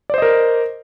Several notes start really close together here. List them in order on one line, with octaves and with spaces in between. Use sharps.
D5 C5 D#5 A#4